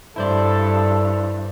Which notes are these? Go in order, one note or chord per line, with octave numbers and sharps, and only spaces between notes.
G2 E4 A4 C5 D5